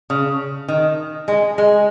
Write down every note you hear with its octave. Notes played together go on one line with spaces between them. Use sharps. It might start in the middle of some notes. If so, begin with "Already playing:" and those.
C#3
D#3
G#3
G#3